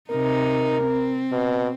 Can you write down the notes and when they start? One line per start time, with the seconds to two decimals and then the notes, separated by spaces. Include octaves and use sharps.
0.11 C3 D#4 A#4
0.84 C4
1.32 B2